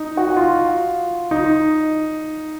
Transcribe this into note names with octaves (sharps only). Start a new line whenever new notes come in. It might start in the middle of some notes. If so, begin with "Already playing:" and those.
Already playing: D#4
F#4
F4
D#4